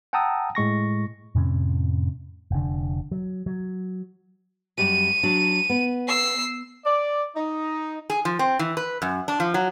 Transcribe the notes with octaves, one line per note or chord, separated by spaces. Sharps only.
F#5 G5 A5 A#5 D#6 E6
A2 G#3 C#6 A#6
F2 A2 C3 C#4
F1 D3
F#3
F#3
F#2 G3 D5 D#7
F#3 D4
B3
E6 C7
D5
D#4
G#4
F3
C4
E3
B4
F#2
D4
F3
F#3